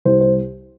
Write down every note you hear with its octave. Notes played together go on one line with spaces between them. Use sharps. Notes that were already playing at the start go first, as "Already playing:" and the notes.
C2 C5
C5